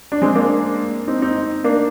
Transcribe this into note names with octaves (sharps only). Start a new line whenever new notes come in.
D4
G#3 C4
A#3 D4
C4 D#4
C4 D#4
A#3 D4